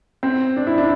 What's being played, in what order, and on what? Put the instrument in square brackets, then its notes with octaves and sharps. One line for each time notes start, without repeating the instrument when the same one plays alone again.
[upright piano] C4
D4
E4
D4